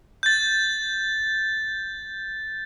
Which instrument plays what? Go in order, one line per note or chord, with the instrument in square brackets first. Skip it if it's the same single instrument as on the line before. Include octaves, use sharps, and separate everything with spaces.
[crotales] G6 A6